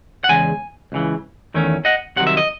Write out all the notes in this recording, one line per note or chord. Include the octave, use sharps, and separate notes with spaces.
F#5
E2 C#3 G#3 G#5
C#2 C#3 E3
E2 D#3 A3 C#4
D#5 F#5
C2 C3 D#3 F#3 F#5
E5
D#5